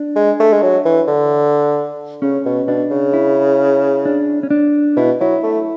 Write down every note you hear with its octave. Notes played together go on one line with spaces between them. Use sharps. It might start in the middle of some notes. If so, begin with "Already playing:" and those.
Already playing: D4
G#3
A3
G#3
F#3
E3
D3
C#3 C#4
B2
B2 D4
C#3
E4
D4
C#4
D4
B2 E4
F#3 E4
A3